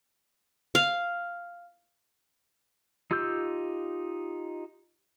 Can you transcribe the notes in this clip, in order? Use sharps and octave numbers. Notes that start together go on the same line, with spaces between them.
F5
D#4 F4 G4 E6 G6